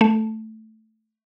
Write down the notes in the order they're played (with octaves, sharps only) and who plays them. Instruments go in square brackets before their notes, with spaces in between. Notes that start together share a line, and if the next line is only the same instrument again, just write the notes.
[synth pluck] A3